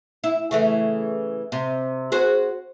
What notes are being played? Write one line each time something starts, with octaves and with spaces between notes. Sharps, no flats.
E4
C#3 E3 A3
C3
F#4 G#4 C5